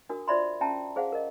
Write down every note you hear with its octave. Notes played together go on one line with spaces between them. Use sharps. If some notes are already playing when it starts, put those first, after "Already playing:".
D4 F#4 A#4 D#6
F4 C5 D5 E5 B5 C6
C#4 E5 G5 A5 A#5
G#4 C5 F5 F#5
A#4 D#5